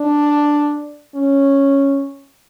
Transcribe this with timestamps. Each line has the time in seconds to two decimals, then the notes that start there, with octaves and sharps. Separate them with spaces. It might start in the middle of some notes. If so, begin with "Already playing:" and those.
Already playing: D4
1.15 C#4